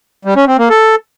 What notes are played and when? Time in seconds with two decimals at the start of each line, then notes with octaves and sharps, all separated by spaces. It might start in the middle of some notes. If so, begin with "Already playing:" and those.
0.25 G3
0.36 C#4
0.47 C4
0.58 A#3
0.70 A4